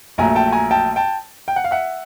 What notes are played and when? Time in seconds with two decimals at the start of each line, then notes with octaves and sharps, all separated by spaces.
0.18 A#1 A#2 F#3 A3 G#5 A#5
0.36 G5 A5
0.52 G#5 A#5
0.71 G5 A5
0.96 G5 A5
1.48 G5
1.56 F#5
1.64 F5
1.71 E5 F#5